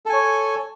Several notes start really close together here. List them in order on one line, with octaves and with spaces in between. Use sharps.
A4 G#5 C#5